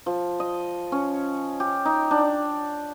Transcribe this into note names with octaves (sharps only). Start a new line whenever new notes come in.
F3
D#5
C#4
G4
D#4
D4